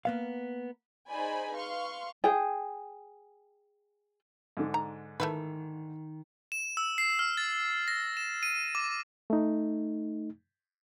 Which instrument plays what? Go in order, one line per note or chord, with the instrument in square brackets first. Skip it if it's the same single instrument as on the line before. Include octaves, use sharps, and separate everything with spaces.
[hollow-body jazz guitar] A#3 B3 F5
[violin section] D#4 G#4 C5 D5 G#5 B5
B4 F5 C6 C#6
[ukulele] G#4 G5
[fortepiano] G#2 D3
[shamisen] A#5
[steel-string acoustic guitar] D#3 [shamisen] A3 E4 B4
[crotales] E7
E6
C7
F6
A6
A#6
E7
D#7
D6
[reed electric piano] A3 D#4